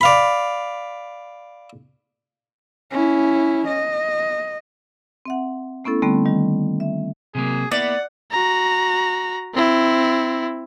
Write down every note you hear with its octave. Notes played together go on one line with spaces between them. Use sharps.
D5 F5 B5
C#4 E4
D#5
C4 E5 F#5
A3 B3 C#4 E4 A4
D3 G3 A3 B3 C4
D#3 G3
E5
C3 F#3 A#3 G#4
A#3 B3 E4 D5 F#5
F#4 A#5
C4 E4